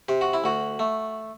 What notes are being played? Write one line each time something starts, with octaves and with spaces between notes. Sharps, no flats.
C3 G4
F#4
E4
D2 F#4
A3